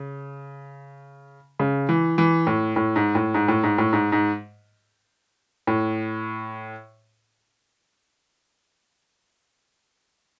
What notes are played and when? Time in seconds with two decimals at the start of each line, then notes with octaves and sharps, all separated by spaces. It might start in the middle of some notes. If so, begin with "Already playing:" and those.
Already playing: C#3
1.59 C#3
1.89 E3
2.18 E3
2.47 A2
2.76 A2
2.96 G#2
3.15 A2
3.34 G#2
3.48 A2
3.63 G#2
3.78 A2
3.93 G#2
4.12 G#2
5.67 A2